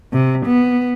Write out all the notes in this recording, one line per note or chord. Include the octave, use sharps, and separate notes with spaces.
C3
B3